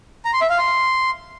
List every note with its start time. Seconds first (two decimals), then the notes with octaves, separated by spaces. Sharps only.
0.25 A#5
0.33 C6
0.42 E5
0.50 F5
0.58 C6